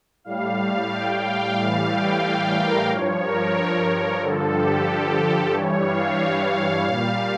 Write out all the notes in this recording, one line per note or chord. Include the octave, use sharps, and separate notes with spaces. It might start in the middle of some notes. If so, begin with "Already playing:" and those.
A2 G3 F5
G5
F5
A2 E3 G3 F5
G5
F5
A#4
G2 F3 C#5
A#4
A#4
G2 D3 F3 A4
G4
A4
G2 E3 G3 C#5
F5
F5
A#2 G3 F5